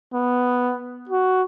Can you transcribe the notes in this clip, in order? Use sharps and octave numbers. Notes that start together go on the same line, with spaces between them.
B3
F#4